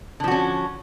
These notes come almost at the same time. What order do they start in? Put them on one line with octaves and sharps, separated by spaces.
D3 F3 F#4 C#4